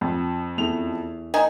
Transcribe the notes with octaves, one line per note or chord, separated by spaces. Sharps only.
F2
E2 A3 F7
D#3 D#4 G#5